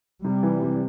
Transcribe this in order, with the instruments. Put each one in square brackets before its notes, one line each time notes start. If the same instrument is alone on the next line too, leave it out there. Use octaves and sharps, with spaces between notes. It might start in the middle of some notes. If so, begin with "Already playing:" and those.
[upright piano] C3 [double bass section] G3
[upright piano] E3
C3